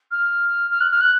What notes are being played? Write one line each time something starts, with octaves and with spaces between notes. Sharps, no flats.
F6
F6
F#6
F6
F#6